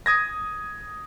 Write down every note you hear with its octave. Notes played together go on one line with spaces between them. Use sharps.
D#6 G#6 A#6